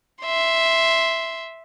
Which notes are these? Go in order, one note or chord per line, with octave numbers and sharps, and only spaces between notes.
E5 C6